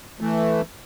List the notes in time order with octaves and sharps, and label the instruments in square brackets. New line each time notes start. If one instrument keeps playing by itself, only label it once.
[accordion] E3 A3